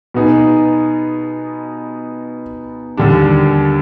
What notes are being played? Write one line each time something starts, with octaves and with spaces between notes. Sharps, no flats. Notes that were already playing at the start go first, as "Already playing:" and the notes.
B2 B3 D#4 G#4
D#2 D3 G3 D4